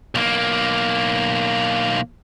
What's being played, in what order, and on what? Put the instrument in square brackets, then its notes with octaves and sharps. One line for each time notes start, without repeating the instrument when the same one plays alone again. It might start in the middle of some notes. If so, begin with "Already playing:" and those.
[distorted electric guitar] B1 A#3